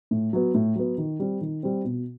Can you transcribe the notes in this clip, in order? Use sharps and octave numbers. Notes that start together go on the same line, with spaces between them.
A2
F#3 B3
A2
F#3 B3
D#3
G3 C4
D#3
G3 C4
B2